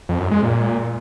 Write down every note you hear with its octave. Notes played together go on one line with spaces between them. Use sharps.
F2
F#2
G#3
A#2